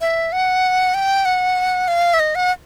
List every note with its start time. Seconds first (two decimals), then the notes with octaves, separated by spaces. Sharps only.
0.01 E5
0.32 F#5
0.94 G5
1.25 F#5
1.88 F5
2.14 E5
2.20 D#5
2.35 F#5